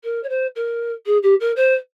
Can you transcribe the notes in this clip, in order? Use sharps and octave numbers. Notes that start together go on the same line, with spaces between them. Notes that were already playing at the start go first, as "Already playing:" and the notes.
A#4
C#5
C5
A#4
G#4
G4
A#4
C5